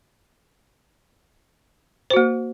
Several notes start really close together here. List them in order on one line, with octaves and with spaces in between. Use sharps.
C5 F#4 A#3